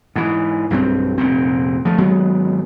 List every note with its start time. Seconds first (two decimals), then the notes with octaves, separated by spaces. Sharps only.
0.16 G#2 E3
0.70 B1 G2 F#3 C4
1.18 F1 A#2 C4
1.85 F3 A3
1.98 G#1 F#3 G#3 B3